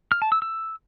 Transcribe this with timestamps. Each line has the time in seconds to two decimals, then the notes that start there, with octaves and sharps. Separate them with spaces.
0.12 F6
0.22 A5
0.32 E6
0.42 E6